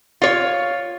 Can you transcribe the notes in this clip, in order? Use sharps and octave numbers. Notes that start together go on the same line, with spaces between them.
F4 C#5